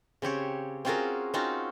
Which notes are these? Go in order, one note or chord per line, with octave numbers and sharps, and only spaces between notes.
C#3 C4 G4 C#5
C4 C#4 F4 F#4 G#4 A#4
C4 C#4 D#4 F4 F#4